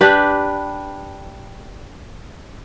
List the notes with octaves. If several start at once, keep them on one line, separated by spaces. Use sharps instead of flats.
D4 G4 B4